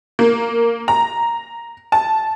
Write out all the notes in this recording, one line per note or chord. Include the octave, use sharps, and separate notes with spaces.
A#3
A#5
A5